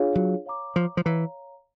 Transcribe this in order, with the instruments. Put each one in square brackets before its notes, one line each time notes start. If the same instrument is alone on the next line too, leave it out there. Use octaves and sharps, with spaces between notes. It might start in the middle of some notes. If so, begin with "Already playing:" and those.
Already playing: [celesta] D4 F4 G#4 C#5 F5
[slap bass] F#3
[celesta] C#5 F5 A#5 D6
[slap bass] F3
F3
[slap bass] E3 [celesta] C#5 F5 A#5